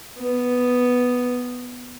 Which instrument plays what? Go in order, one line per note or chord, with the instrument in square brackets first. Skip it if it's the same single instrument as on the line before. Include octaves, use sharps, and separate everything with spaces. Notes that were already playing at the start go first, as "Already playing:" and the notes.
[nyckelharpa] B3